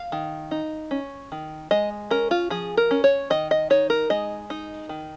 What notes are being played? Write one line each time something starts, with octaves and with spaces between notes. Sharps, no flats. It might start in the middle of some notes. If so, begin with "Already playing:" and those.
Already playing: F5
D#3
D#4
C#4
D#3
G#3 D#5
C#4 A#4
F4
F3 G#4
A#4
C#4
C#5
D#3 D#5
D#5
D#4 C#5
A#4
G#3 D#5
D#4
D#3